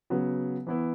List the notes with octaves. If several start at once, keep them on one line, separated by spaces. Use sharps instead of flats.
C#3 F#3 B3
E3 B3 E4